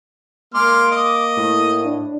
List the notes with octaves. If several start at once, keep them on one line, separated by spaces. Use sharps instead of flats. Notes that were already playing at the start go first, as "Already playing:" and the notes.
G#3 A#3 C6 D6 F6
D#5
A2
D4